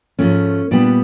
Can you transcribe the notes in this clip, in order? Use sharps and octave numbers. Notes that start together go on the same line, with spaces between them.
G#2 F3 A3 C#4
A#2 G3 B3 D4